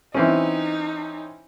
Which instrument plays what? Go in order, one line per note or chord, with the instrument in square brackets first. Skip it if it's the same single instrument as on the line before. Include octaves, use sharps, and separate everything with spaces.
[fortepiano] E3 C4 C#4 [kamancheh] D#4